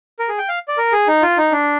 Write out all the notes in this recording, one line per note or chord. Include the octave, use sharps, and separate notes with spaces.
A#4
G#4
G5
F5
D5
A#4
G#4
D#4
F4
D#4
D4